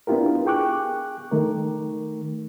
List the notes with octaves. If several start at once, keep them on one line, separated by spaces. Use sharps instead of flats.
B3 D4 E4 F4 G4 A#4
G#4 G5 C#6 D6 F#6
D#3 A3 A#4